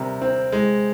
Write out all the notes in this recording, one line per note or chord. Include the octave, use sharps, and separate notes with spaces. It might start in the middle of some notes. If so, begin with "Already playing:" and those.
Already playing: C3 G3 A#4
C4
G#3